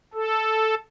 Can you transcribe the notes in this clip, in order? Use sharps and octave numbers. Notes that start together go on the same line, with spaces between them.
A4